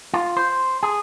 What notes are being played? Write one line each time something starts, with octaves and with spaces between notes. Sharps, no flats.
F4
C5
G#4